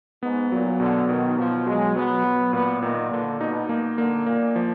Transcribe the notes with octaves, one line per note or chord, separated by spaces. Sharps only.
G#2 B3
A#2 F#3
B2 D3
B2 D#3
B2 F3
F#3 G#3
F#3 B3
F#3
A#2 B3
A#2 D#3
A#2 D3
B2 D#4
A#3
D3 A#3
A#2 A#3
F3